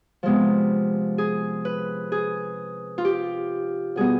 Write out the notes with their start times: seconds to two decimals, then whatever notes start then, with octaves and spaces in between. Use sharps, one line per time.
0.23 C3 F3 G#3 B3
1.18 G#4
1.65 B4
2.12 G#4
2.98 F4
3.05 G4
3.96 B2 G3 B3 G#4